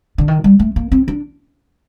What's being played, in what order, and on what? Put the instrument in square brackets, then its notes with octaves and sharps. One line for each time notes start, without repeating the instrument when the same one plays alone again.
[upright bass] D3
D#3
G3
A3
A#3
C4
D4